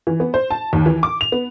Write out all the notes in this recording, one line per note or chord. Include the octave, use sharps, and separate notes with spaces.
E3
B3
C5
A5
D#2
E3
D6
F7
B3